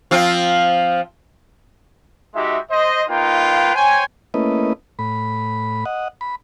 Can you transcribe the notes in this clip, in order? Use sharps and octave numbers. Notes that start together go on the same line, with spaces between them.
F3 C4 F4
G#3 D#4 F#4 G4 E5
C5 D#5
A#3 D#4 F4 B4 F5 G5
C5 C#5 G5 G#5
A3 A#3 C#4 E4 B4 D#5
A2 B5
D#5 F#5
B5